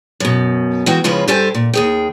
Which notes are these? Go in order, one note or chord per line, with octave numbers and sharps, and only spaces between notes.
F#2 B2
E3 G#3 F#4 G5
C#3 F3 G#3 C#4 F4 B4
G2 G4 A4 C5 G5 G#5
A#2
D#2 G#4 G5